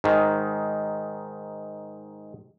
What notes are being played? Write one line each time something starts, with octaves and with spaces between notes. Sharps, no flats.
G#2 D#3